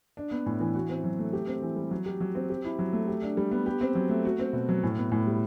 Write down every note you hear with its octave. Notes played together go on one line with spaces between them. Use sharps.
D4
B3
A2
E3
F#4
C4
F#3
A3
G4
C4
E3
G3
F#3
G4
F#3
C4
G4
E4
F#3
A3
G4
D4
G3
B3
G4
C4
F#3
A3
F#4
C4
B2
F#3
A2
B3
A2
G3